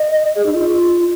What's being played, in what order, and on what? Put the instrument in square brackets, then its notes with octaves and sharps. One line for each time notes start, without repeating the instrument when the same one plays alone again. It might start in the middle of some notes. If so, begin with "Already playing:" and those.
Already playing: [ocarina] D#5
G#4
D#4
F4